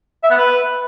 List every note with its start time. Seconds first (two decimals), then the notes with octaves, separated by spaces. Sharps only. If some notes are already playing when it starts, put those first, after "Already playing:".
0.23 E5
0.30 B3
0.37 B4